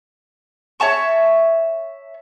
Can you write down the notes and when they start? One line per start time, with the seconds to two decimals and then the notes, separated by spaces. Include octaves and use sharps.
0.80 C#5 E5 A5 C#6